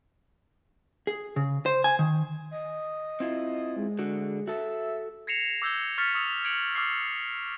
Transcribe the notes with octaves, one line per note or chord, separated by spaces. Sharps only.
G#4
C#3
C5
G#5
D#3
D#5
C4 E4 F4
G#3
D3 F#4
F#4 A4 E5
G#6 A#6 C7 C#7 E7 F7
D6 E6 G6 G#6 G7
C#6 F6 A6 B6 C#7
C#6 D#6 E6 F7
G#6 C#7 D7 F7 F#7
D6 E6 F6 C7